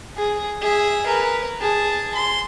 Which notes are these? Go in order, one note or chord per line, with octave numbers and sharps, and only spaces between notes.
G#4
G#4 E5
A#4 B4
G#4 A5
C6